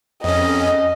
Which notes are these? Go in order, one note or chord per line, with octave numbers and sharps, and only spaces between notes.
F2 C#4 D#5